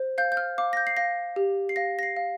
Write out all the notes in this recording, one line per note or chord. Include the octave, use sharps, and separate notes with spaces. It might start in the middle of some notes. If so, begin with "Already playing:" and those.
Already playing: C5
F5 G6
G6
F6
F5 D6
A#6
G6
C7
F5 A#6
G4
C7
F5 A#6
A#6
C7
F5